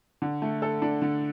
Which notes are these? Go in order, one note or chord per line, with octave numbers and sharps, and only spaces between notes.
D3
A3
A4
D4
D3